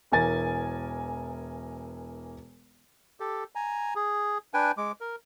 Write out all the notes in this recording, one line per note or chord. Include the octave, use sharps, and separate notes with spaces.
E1 E3 A#4 G#5 A6
G4 A4
G#5 A#5
G#4
D4 B4 G5 G#5
G#3 D6
A#4